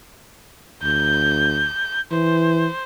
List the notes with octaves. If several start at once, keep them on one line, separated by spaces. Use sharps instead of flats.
D2 G6
E3 C5